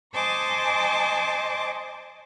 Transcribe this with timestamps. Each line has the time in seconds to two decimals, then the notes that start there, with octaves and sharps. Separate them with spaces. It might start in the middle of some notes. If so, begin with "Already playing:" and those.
0.14 C5 D#5 G#5 A5 C#6 D6